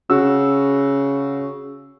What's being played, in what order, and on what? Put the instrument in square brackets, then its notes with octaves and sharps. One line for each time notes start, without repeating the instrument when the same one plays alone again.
[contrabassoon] C#3 [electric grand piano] F#4 E6